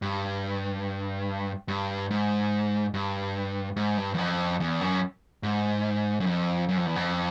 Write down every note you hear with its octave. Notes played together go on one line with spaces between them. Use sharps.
G2
G2
G#2
G2
G#2
G2
E2
F2
E2
F#2
G#2
F#2
F2
F#2
F2
E2
F2